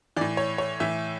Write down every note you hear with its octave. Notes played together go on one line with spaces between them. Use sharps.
A2 E3 D5
C#5
C#5
A2 E3 E5